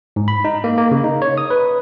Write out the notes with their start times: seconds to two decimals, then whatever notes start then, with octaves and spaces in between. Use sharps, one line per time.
0.16 G#2
0.28 B5
0.45 D#4
0.64 A#3
0.78 A#3
0.91 C#3
1.04 D#4
1.22 C#5
1.38 D#6
1.50 B4